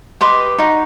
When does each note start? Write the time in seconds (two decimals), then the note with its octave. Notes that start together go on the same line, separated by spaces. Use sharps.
0.21 G4 B4 D#5 C6 D6
0.58 D#4 F#4